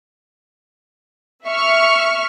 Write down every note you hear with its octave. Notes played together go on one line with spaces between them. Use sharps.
E5 C#6 F6